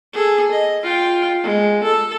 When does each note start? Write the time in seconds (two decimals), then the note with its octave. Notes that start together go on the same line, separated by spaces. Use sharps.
0.13 G#4 A4
0.51 D#5
0.83 F4 G5
1.43 G#3
1.83 A4